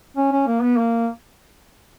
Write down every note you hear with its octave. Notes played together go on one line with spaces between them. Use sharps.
C#4
C#4
A#3
B3
A#3